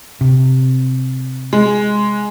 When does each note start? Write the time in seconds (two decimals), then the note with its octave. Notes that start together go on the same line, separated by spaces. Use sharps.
0.21 C3
1.53 G#3